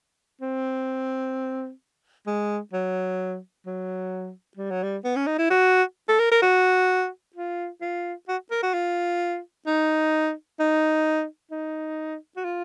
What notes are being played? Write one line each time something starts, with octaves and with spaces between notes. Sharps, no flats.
C4
G#3
F#3
F#3
G3
F#3
G3
B3
C#4
D#4
E4
F#4
A4
A#4
A#4
F#4
F4
F4
F#4
A#4
F#4
F4
D#4
D#4
D#4
F#4
F4